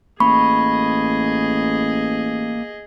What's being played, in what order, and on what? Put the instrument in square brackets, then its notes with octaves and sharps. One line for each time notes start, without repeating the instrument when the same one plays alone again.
[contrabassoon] A1 [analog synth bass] A#3 [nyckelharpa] G#4 D#5 [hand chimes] B5 C#6